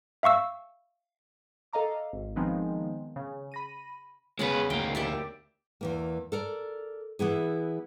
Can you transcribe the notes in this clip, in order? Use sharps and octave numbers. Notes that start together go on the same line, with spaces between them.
E5 F5 C#6 E6
A4 D#5 F5 A#5 D6
G#1
D#3 F3 G#3 B3 C4 D#4
C#3
B5 A#6 D#7
C#3 G#3 B3 B4 F#5
D2 A#3 G5
G4 D5 E5
E2 E3 A#3
A4 A#4 D5
E3 B3 E4 G#4